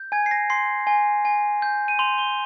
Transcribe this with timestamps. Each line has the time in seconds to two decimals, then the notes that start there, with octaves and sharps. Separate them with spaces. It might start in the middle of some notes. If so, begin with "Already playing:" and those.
Already playing: G6
0.12 G#5 G#6
0.26 C7
0.31 A#6
0.50 C6 C7
0.87 G#5
1.25 G#5
1.62 G6
1.88 D#7
1.99 C6 F7
2.18 G7